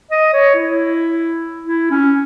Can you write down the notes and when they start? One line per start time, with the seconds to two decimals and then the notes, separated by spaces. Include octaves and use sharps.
0.11 D#5
0.33 C#5
0.55 E4
1.62 E4
1.91 C#4